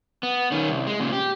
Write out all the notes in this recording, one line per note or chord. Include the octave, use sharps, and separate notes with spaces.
B3
D#3 C#4
C2
G#3
A#2 C#3
G4